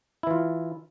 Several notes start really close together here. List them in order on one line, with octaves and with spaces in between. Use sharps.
E4 E3 F4